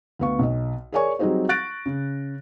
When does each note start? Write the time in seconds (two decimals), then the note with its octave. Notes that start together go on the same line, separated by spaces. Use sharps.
0.19 D2 D3 B3 F5 C#6
0.39 B1 D#5
0.92 G#4 A#4 C#5 D5 G#5 C#6
1.19 F#3 G3 C4 D#4 G#4 C5
1.49 C#6 F#6 A6 A#6 D7
1.86 C#3